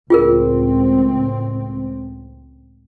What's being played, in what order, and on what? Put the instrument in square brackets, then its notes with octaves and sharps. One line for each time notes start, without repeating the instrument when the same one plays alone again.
[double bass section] C#2 A2 C4 [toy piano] F4 G#4 A#4